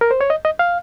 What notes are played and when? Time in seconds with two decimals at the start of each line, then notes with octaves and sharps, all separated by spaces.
0.01 A#4
0.11 C5
0.21 C#5
0.30 D#5
0.45 D#5
0.59 F5